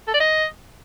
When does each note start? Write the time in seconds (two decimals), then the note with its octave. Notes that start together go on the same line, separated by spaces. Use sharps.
0.08 A4
0.14 D5
0.20 D#5